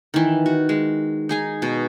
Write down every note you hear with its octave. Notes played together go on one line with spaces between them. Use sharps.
D#3 E3
F#4
G#3
D#4 G#4 G#5
B2